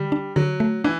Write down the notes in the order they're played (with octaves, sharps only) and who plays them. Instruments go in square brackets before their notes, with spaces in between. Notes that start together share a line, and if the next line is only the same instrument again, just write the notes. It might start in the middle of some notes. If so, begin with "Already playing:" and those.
Already playing: [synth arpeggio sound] D3 [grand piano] G3
[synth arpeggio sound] D4
[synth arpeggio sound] D3 [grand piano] F#3
[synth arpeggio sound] A3
[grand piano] E3 [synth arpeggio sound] D4